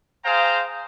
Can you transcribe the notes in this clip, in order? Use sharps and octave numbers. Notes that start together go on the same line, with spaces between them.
G#4 C5 F5 G5 A#5